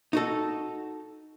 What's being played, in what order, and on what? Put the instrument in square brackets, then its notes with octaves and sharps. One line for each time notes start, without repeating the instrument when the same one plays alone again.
[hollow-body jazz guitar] D#4 F#4 A4